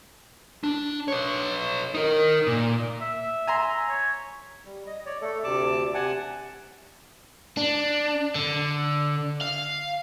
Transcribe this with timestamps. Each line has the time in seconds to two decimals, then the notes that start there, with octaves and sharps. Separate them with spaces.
0.64 D4
1.08 B4 C#5
1.94 D#4 A#4
2.47 A#2
3.01 E5
3.47 G#5 A#5 C6
3.89 C#5
4.65 G3
4.87 D#5
5.06 C#5 D5
5.22 A3 A4
5.44 D2 C3 D5 A5 D6
5.94 C3 F#5 G#5 A5
7.57 D4
8.35 D3
9.41 F5